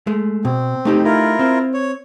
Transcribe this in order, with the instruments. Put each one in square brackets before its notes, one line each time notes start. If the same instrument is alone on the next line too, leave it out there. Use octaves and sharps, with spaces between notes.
[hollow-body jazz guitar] G#3 A3
[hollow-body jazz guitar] B2 [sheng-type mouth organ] C4
[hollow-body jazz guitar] A3 D#4 G4
[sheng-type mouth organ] E4 F4 A#4
[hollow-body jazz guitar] C4 C5
[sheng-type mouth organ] C#5